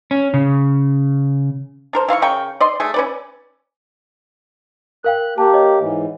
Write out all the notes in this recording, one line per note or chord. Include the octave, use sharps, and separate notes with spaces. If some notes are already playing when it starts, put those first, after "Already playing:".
C#4
C#3
D4 A#4 C5
E3 F5 C6 C#6
C#3 A#4 G5 C#6
D5 D#5 C6
A3 G#4
C#4 B4 D5
A#4 F5 G5 F#6
A#3 G4 A5
C#5 D#5
G#2 E3